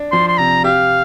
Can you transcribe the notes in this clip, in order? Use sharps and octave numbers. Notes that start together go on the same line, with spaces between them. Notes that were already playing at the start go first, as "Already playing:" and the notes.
Already playing: D4
F3 C6
C6
C3 A#5
G4 F5